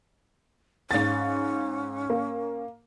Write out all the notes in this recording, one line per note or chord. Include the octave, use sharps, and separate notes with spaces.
G#2 C#4 F5 A6
A#3